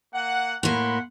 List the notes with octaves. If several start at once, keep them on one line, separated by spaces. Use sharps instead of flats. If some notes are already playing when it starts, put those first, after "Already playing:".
A#3 F#5
A2 A#3 F#5 B5 C6